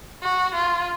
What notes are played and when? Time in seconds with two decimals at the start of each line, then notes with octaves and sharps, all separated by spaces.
0.22 F#4
0.55 F4